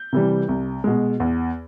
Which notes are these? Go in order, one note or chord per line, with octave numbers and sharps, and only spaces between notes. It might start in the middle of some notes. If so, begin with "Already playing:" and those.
Already playing: G6
C3 E3 G3
C2
B2 G#3
E2